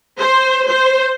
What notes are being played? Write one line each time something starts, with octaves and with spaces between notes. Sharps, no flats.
C5
C5